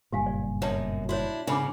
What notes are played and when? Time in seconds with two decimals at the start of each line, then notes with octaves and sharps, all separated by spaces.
0.12 F#1 G2 A#2 G4 F5 G#5
0.26 D5
0.62 F#2 B2 C#5 D5 A5
1.09 D4 E4 F#4 C#5
1.47 F2 G#2 C#3 D4 B5 D6